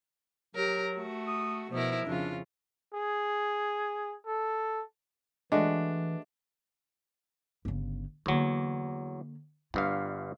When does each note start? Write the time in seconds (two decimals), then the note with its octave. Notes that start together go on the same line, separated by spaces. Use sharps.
0.55 F#3 G4 A#4
0.95 A3 F#4
1.27 D#6
1.71 B2 F3 E4 A#4
2.06 F2 C#3 D4 F4
2.94 G#4
4.26 A4
5.52 E3 G#3 A3 D4 F#4
7.65 G1 C#3
8.26 E2 D3 F#3 A#3
9.74 G1 G2 F4 F5